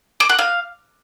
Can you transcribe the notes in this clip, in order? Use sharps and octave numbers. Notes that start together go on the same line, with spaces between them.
D6
F#5
F5